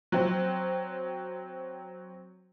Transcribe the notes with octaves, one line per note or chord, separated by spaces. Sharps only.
F#3 C4